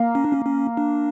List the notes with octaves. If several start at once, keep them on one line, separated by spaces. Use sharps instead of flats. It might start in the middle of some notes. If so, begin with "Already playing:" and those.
Already playing: A#3
C#4
D4
C#4
C#4
D4